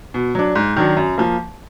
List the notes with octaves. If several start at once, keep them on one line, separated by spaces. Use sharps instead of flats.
B2
F#3 D4
G#2
D#3 F#3 D4
F#2
F3 A#3